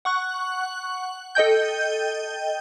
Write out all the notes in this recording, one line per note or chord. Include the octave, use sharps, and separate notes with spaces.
F#5 C#6 F#6
A4 D#5 G5 G6